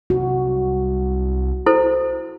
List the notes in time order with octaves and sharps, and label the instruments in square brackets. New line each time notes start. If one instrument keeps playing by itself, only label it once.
[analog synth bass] C2 [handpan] F#4
[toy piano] E4 A4 C5